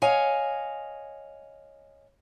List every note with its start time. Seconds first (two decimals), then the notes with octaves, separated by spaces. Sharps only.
0.02 C#5 D#5 F5 G#5